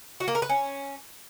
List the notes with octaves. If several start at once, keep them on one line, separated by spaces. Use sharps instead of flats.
F#4
A#3
A#4
B4
C#4